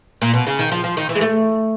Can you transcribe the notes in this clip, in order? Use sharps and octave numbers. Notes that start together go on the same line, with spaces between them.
A#2
B2
C#3
D#3
F3
F3
D#3
E3
G#3
A3